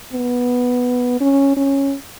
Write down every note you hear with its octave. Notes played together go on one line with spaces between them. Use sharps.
B3
C#4
C#4